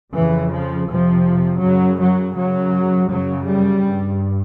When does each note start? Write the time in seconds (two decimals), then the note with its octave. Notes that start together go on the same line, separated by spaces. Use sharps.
0.14 F2 C#3 E3
0.51 F3
0.89 F2 C3 F3
1.62 F#2 C#3 F#3
1.99 F#3
2.36 F#2 C#3 F#3
3.09 F#2 C#3 F#3
3.46 G3
3.83 G2